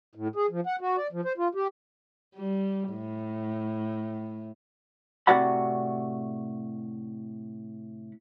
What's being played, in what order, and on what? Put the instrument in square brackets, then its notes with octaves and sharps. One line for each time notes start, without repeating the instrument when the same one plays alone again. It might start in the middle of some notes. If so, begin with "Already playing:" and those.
[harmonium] A2
G#4
F3
F#5
F#4
D5
F3
C5
F4
G4
[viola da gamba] G3
A2
[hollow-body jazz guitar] A2 C3 F#4 D5 F#5 B5